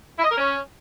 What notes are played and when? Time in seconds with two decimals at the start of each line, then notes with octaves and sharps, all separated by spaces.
0.17 E4
0.24 D#5
0.31 A#4
0.37 C#4